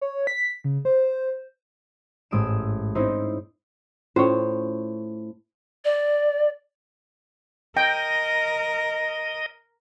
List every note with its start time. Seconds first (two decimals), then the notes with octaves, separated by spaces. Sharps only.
0.01 C#5
0.27 B6
0.64 C#3
0.85 C5
2.31 A1 G#2 D#6 E6 D7 E7
2.95 C4 C#4 D#4 E4 A#4 C5
4.16 A2 C#4 F4 C5 C#5 G5
5.85 D5
7.77 A#4 D#5 G5